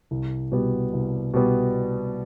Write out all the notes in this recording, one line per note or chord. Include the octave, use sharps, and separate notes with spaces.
C2
B2 G3 B3
C2
B2 G3 B3